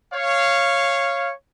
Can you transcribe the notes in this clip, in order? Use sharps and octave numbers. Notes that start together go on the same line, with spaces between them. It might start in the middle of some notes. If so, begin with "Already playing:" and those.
C#5 F5